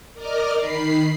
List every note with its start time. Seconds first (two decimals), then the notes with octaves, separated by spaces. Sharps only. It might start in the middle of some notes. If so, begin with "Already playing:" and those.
0.14 A#4 D5 D#5 D6 F6
0.54 D#3 B5 C7